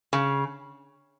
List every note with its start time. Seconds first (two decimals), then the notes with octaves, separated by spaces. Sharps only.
0.13 C#3